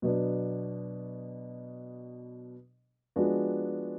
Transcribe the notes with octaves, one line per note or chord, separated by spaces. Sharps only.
B2 F#3 B3 D4
F3 G#3 B3 D4 F#4